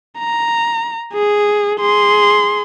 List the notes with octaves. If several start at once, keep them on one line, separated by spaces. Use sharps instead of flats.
A#5
G#4
G#4 C6